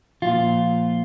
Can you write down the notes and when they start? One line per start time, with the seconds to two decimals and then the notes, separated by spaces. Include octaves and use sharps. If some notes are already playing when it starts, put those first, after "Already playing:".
0.22 A#2 F3 F4